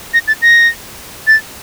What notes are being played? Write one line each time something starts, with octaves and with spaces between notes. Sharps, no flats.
A#6
A6
A#6
A6